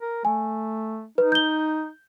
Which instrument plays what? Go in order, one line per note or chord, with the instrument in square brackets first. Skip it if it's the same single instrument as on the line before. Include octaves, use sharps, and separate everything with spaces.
[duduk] A#4
[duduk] A3 [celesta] G#5
[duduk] D#4 [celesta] B4
[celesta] G6 G7